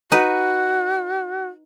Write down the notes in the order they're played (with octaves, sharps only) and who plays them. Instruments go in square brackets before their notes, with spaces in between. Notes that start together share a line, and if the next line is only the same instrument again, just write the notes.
[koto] D#4 B4 [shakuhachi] F#4